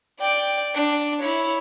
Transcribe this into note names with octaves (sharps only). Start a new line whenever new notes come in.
D5 G5
D4
E4 C#5